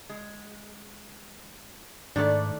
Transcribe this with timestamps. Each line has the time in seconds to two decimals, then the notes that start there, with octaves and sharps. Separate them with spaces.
0.09 G#3
2.16 G#2 D#3 A3 D4 A4 D5